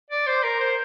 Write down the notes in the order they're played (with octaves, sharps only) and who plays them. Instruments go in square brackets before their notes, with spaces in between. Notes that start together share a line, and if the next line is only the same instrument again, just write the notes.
[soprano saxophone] D5
C5
A#4
C5